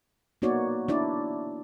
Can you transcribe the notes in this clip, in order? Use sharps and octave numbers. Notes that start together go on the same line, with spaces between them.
A#3 B3 D#4 F#4 C#5 D5
D4 E4 D5